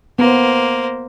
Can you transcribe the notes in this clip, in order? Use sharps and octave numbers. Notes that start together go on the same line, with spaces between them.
A#3 B3 C5